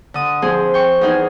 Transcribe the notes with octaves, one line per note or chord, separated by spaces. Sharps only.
D3 D#6
F3 C4 G#4
G5 C#6
E2 D#4 G#4